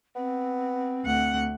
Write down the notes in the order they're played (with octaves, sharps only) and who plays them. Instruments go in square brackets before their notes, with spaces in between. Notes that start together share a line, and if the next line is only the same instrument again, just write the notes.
[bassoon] B3 [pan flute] C4
[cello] D2 F#5